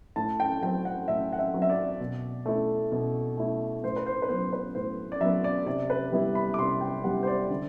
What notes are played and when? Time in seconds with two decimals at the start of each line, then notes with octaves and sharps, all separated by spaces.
0.16 A2 A5
0.40 G5
0.62 F#3 C4 G5
0.85 F#5
1.08 A2 E5
1.33 F#5
1.39 E5
1.54 F#3 C4
1.62 E5
1.70 D5
2.00 B2
2.46 A3 E4
2.92 B2
3.37 A3 E4
3.83 A2 C5
3.96 B4
4.06 C5
4.22 B4
4.29 F#3 B3 C5
4.53 B4
4.75 A2 C5
5.12 D5
5.20 F#3 B3 E5
5.44 D5
5.66 C3 D5
5.90 B4
6.12 G3 B3 E4
6.35 B5
6.54 D6
6.58 C3 C6
6.81 G5
7.04 G3 B3 E4 F#5
7.23 C5
7.27 D5
7.50 D3